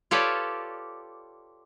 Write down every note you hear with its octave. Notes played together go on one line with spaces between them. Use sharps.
F4 G4 A4 B4 C#5 D5